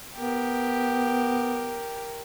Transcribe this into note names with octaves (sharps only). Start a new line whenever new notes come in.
B3 G4 A#4